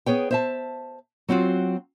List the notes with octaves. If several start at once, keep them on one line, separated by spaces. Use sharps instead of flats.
B3 G#4 C#5 G5
C5 E5 A5
F#3 C4 F4 F#4